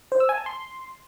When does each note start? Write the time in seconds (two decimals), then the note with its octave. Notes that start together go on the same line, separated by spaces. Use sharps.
0.12 C5
0.20 E6
0.29 G#5
0.38 A5
0.46 C6